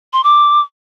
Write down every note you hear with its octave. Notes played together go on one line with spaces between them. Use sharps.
C6
D6